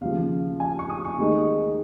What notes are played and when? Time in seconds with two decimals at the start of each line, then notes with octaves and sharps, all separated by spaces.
0.01 D#2 C#3 F3 F5
0.60 G#5
0.79 C#6
0.90 D#6
1.05 C#6
1.18 D#2 D#3 G#3 D#4